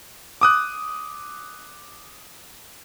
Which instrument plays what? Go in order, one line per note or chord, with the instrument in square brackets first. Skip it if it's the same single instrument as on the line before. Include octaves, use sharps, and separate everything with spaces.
[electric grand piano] D6 D#6 F#6